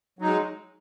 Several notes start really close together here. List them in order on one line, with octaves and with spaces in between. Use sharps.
F#3 D#4 G#3